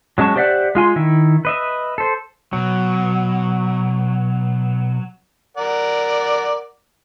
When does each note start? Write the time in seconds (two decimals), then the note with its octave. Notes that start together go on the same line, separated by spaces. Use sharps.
0.18 F#3 G#3 C#4 A5 C#6
0.36 G4 C5 D5 E5 F#5
0.75 G#3 F4 G#5 C6
0.96 D#3 E4
1.45 B4 D#5 E5
1.98 A4 C5
2.53 B2 F#3
5.57 A#4 D5 F#5